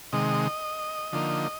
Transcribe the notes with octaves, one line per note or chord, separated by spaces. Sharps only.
C3 D#3 G#3 D#5
D3 F3 A#3 D#4